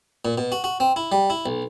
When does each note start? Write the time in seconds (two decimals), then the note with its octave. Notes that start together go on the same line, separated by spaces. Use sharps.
0.25 A#2
0.38 B2
0.52 F#4
0.64 F#4
0.80 C4
0.96 E4
1.12 G3
1.30 E4
1.46 B1